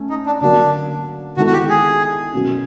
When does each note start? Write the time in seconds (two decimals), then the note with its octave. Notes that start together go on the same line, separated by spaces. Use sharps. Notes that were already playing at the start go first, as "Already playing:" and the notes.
Already playing: A3 C#4
0.10 D#4
0.26 D4
0.41 D3 F#3 A#3 D4
1.37 D#3 G#3 B3 E4 F#4 A4
1.47 F#4
1.53 G4
1.69 G#4
2.33 B2 F#3 A#3 C#4